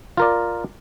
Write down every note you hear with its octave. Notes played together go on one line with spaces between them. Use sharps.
F4 A#4 D5